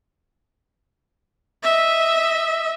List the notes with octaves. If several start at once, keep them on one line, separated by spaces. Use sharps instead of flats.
D#5 E5